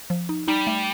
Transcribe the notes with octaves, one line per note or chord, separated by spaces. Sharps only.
F3
D#4
G3 D#4
A3